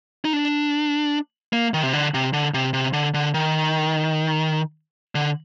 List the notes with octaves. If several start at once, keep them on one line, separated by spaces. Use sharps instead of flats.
D#4
D4
A#3
D#3
C3
D3
C3
D3
C3
C3
D3
D3
D#3
D3